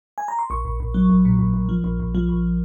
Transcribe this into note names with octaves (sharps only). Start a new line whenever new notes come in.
G#5
A#5
C6
A#1 C#6
A#1
A#1
F#3
A#1
A#2
A#1
A#1
F3
A#1
A#1
F3
A#1